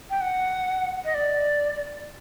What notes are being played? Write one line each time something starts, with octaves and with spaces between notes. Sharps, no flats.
G5
F#5
D#5
D5